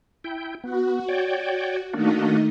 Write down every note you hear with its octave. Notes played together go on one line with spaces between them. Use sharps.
E4 G5
B3 F#4
C#5 D5 G5
D#3 A3 A#3 D4 D#4 F#4